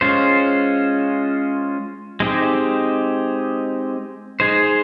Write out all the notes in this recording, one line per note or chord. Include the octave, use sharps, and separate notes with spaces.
G#3 C#4 F4 C5
G#3 C4 D#4 G4
G#3 D#4 G#4 C5